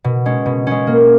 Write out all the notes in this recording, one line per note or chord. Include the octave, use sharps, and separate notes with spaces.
B2
G#3 C#4
B2
G#3 C#4
A#3